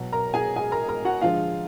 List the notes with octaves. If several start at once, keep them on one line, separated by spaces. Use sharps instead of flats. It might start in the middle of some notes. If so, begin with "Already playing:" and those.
Already playing: B2 F#3
A#4 A#5
G#4 G#5
G#4 G#5
A#4 A#5
A#4 A#5
F#4 F#5
D3 F3 G#3 F4 F5